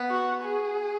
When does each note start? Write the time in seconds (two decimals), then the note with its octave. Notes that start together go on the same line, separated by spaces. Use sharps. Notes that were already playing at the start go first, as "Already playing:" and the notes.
Already playing: B3
0.10 F#4
0.43 G#4